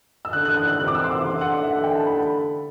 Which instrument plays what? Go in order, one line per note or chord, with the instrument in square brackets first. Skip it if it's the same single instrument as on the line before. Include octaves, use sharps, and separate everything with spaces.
[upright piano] E6
[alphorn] D3 [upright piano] F#6
[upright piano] F#6
F#6
F#6
[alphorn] C3 [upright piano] F#6
[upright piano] D6
E6
C6
D6
[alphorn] D3 [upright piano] C6
[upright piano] F#5
E5
F#5
G5
A5
B5